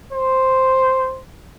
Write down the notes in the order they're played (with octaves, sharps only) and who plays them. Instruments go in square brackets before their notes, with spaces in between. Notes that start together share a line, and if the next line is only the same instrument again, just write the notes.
[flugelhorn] C5